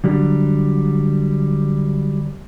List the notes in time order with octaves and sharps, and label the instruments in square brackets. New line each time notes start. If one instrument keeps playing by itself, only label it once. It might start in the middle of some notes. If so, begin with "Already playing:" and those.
[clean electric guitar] D3 F#3 G3